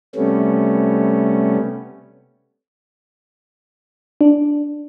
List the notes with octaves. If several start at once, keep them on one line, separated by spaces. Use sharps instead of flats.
C3 G3 A3 B3 C#4
D4